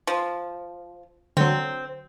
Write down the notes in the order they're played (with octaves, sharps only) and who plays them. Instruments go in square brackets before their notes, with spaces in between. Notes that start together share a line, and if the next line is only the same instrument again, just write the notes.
[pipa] F3
[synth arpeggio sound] D3 F#3 [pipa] C4